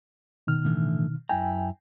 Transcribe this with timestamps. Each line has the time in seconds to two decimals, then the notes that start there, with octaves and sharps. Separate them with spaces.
0.47 B2 D#3 F6
0.65 A2 D3 E3
1.29 F#2 E4 G5 G#5 A#5